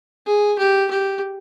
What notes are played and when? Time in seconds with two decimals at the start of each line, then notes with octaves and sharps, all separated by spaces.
0.26 G#4
0.59 G4
0.90 G4